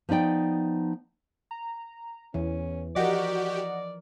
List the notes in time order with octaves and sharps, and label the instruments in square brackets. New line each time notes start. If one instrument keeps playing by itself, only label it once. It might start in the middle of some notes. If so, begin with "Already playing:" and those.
[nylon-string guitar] F3 B3 D#4 D5 G5
[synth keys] A#5
[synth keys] E2 [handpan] E3 [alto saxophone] C#4
[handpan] F3 A#4 [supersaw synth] F#4 G4 [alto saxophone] D5 [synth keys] D#5 F#5